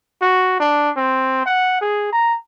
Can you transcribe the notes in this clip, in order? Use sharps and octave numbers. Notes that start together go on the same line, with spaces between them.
F#4
D4
C4
F#5
G#4
A#5